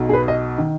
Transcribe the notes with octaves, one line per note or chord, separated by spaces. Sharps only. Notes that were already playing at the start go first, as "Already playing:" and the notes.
Already playing: B1 B2
G#4
B4
D#5
D#3